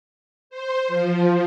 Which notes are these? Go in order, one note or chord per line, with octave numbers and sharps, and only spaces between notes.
C5
F3